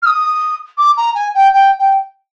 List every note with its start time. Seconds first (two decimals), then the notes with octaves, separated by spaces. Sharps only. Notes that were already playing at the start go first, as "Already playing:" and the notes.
0.02 F6
0.06 D#6
0.78 D6
0.97 A#5
1.15 G#5
1.35 G5
1.53 G5
1.79 G5